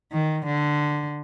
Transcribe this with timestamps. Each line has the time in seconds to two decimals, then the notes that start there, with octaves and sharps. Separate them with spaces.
0.12 D#3
0.46 D3